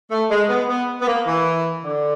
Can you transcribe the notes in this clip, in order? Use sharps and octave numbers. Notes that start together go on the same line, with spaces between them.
A3
G#3
B3
B3
B3
A#3
E3
D3